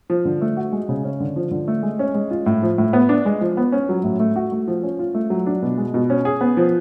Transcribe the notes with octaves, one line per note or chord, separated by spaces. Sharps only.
F3
D3
A3
F#4
G#3
C#3
C#4
D3
F3
D3
A3
G#3
C#4
G#3
F4
A2
F3
A2
B3
D4
G#3
F3
B3
C#4
F#3
A2
A3
F#4
A3
F3
C#4
F4
A3
F#3
D4
B2
G#3
B2
C#4
G#4
B3
F3